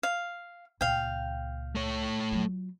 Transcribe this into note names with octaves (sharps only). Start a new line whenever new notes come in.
F5
C#2 A#2 F5 G5
A3 C#5
F#3 F4